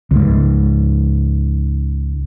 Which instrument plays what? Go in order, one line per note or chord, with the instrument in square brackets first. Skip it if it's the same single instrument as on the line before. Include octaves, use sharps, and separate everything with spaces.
[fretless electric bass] C#2 G#2